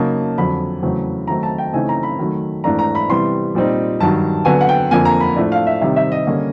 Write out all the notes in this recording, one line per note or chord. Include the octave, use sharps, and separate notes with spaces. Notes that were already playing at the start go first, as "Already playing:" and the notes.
Already playing: C#3 F#3 A#3 D#4 A5
F2 D3 F#3 B5
E2 C#3 F#3 A3 C4
D#3 F#3 A3 C4 D#4 A#5
A5
G5
C#3 E3 A3 C4 D#4 G#5
A#5
B5
D#3 F#3 A3
G#2 E3 A3 D4 A#5
A#5
B5
C3 E3 G3 B3 C6
A#2 G3 C4 D#4
G2 D#3 F#3 A5
D3 F#3 B3 G#5
F#5
G5
F2 D3 F3 A#3 G#5
A#5
B5
A2 F3 A3 D4
F5
E5
C3 D#3 G3 C4 D#4 E5
E5
D#5
D3 G3 A#3 C#4